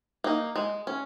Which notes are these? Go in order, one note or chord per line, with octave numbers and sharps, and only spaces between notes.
A#3 D#4
G#3
C#4